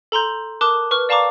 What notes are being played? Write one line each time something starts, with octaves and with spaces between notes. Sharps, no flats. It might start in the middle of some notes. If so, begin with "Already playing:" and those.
A4 A#5 C6 G6
A#4 A5 D6 D#6 F#6
B4 C#6 F6
D5 F5 A5 A#5 C#6 D6